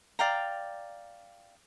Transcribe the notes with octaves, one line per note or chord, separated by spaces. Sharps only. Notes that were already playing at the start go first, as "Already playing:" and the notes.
D5 F5 G5 A#5